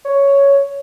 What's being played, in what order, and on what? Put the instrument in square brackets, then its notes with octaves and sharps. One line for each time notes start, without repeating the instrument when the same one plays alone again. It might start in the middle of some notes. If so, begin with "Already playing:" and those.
[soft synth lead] C#5